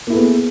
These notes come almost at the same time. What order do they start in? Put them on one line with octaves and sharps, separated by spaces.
A#3 E4 A4 B3 G#4